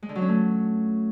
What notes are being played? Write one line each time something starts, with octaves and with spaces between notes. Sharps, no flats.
G#3
D3
F#3
C#4
A3